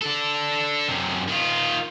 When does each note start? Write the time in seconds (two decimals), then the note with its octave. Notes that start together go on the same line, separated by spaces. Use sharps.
0.02 D4 A4
0.88 F#2 C3
1.29 D#3 F4